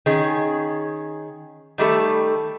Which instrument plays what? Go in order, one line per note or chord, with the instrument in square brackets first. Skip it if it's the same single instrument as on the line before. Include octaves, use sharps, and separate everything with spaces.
[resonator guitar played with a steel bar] D#3 C#4 G#4
D#3 G3 A3 A4